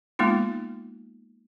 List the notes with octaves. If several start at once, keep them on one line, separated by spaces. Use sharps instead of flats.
G#3 A#3 B3 D#4 F4